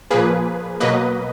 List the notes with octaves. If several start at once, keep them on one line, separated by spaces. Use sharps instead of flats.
A#2 F3 A#3 G#4 B4
B2 F#3 A#3 B4 D#5